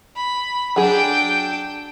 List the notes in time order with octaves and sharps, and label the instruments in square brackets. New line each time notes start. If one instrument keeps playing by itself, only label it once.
[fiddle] B5
[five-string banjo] F#3 G#4 [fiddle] D4 G5